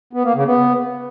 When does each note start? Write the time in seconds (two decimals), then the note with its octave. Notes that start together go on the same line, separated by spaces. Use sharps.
0.13 B3
0.24 A#3
0.35 C#3
0.46 B3